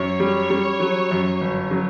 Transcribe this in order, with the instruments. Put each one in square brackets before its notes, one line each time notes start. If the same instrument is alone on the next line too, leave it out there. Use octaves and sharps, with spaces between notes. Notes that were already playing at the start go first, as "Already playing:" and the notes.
Already playing: [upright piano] F#2 [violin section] C#5
[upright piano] G3
G3
F#3
F#2
G1
F#3